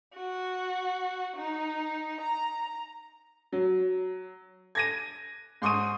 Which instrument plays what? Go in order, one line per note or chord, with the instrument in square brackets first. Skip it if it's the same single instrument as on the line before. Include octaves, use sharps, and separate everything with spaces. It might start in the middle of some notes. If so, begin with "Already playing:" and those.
[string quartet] F#4
D#4
A#5
[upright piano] F#3
G#6 A#6 D#7
G#2 C6 C#6 D#6 D#7